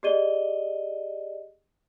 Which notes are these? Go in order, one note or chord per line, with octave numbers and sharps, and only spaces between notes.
G4 G#4 D5 D#5 D#7 G7